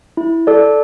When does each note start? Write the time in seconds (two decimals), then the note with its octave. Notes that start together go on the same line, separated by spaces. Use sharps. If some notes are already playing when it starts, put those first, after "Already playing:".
0.17 E4
0.47 A4 D5